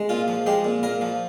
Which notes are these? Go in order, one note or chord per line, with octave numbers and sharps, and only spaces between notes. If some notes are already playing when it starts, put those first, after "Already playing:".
Already playing: G#3
A#2 F4
F3
G#3 G4
A#2
A#2 A#4
F3